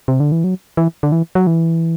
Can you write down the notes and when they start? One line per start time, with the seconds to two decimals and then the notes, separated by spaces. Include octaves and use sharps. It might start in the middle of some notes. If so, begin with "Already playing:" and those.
0.08 C3
0.20 D3
0.32 E3
0.44 F#3
0.77 E3
1.03 D3
1.12 E3
1.35 F#3
1.47 E3